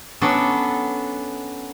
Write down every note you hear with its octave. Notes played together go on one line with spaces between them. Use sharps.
F#3 B3 C#4 D4 A4